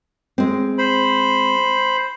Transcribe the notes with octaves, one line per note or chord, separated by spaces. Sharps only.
G#3 C4
C5 B5